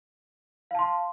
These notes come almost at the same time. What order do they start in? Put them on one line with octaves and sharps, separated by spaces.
F5 A5 C6